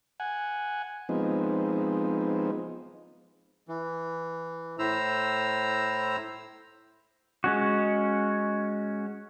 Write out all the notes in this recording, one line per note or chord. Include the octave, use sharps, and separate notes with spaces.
F#5 G#5
F3 G#3 B3 C4 D#4
E3
A2 E4 C5 A#5 E6
G#3 C#4 F#4